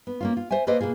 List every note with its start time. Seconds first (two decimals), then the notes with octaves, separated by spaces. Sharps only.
0.07 B3
0.21 A#3 C#4 F4
0.37 F4
0.51 C5 D5 E5 G#5
0.67 A#3 A4 B4 C5 D5 D#5
0.81 B2 A#3 F4 G#4